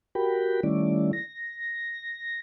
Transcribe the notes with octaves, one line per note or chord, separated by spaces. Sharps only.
F#4 G4 A#4 G5 B5
D#3 G3 A3 C#4 E4 D5
A#6